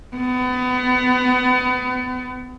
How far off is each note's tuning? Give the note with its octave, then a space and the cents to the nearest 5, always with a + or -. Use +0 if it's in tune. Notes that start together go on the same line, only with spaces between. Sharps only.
B3 +30